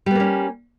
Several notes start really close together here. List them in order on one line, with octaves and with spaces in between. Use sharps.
G3 B3 A#3 C#4